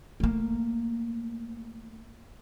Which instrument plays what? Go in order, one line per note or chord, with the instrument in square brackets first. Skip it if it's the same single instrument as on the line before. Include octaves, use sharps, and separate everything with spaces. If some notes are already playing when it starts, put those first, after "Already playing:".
[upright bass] A3 A#3